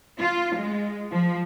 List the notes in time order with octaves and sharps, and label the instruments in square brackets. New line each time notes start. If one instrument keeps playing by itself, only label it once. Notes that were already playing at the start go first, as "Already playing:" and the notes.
[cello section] F4
G#3
F3